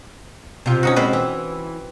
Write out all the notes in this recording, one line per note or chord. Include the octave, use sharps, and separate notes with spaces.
C3 F4
C#4 D#4 F#4
G#3 C4 B4
E3